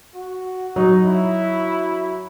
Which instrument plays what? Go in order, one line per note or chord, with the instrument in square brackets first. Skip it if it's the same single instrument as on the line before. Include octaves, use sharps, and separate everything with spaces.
[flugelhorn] F#4
[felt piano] F#3 [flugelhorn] D#4
[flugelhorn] E4